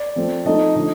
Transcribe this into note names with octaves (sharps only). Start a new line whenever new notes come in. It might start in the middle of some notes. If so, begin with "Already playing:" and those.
Already playing: D5
F3 A3 C4
F3 A3 C4 D#4 D#5
D3 F3 A3 D#5